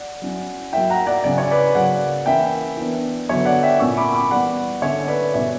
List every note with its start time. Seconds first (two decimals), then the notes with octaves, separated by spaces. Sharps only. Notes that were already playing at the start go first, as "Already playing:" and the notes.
Already playing: D5 F#5
0.22 F#3 C#4 E4
0.72 F#3 A#3 E4 E5 G5
0.90 F#5 A#5
1.06 D5 F#5
1.24 C#3 F#3 C#4 E4 D5
1.38 C#5
1.51 B4 D5
1.75 C#3 F#3 A#3 D5 F#5
2.26 E3 A#3 C#4 E4 E5 G5
2.77 E3 B3 D4
3.29 D3 F#3 B3 C#5 E5
3.45 D5 F#5
3.63 E5 G5
3.79 A#2 A#3 C#4 E4 C#6 E6
3.97 B5 D6
4.14 B5 D6
4.31 E3 G3 B3 D5 F#5
4.82 D3 A#3 C#4 E4 C#5 E5
5.07 B4 D5
5.34 B2 G3 C#4 E4 C#5 E5